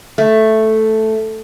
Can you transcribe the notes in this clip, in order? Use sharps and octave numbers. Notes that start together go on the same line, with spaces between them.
A3